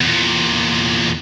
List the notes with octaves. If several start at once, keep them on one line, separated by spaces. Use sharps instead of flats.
E2 A#2